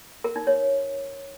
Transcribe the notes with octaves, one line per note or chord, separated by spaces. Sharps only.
A#4
D#4
C#5